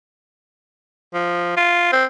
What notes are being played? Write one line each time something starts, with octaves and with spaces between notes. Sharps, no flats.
F3
F4
C4